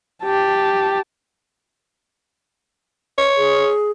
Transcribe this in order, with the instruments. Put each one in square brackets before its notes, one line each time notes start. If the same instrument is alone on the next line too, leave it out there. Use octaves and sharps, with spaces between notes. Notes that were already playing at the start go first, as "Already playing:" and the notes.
[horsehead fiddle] G4 A5
[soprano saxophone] C#5
[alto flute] G#4